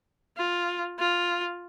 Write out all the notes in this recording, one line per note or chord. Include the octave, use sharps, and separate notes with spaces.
F4
F4